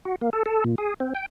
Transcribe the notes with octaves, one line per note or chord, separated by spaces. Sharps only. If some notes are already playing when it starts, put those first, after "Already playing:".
F#4
A#3
A4
A4
A#2
G#4
C4
G5